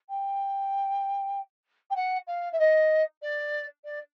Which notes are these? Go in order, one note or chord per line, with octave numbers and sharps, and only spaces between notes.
G5
G5
F#5
F5
E5
D#5
D5
D5